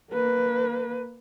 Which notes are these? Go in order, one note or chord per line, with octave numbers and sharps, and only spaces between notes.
A#3 B4